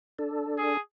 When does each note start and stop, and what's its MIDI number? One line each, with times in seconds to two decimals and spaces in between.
0.19 0.77 62
0.19 0.77 69
0.58 0.80 68